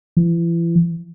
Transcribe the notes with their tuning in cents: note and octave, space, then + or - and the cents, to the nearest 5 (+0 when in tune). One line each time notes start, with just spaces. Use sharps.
E3 +35